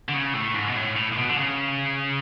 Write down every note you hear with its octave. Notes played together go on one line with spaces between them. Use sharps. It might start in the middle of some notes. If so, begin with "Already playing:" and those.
D3
C#3
A2
G#2
B2
A2
A2
A2
B2
D3
C#3